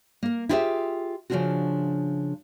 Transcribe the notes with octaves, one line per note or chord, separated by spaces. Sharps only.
A#3 A#4
E4 F4 G4 G#4 C5 E5
C#3 F3 G3 D4 F4 F#4